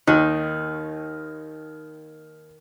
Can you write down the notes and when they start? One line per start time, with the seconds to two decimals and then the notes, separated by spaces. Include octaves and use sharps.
0.07 D#2 D#3 D#4 F#6